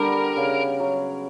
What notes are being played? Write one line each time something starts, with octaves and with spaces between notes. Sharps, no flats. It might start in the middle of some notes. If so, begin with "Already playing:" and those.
Already playing: D3 G3 B3 A#4
C#3
F#3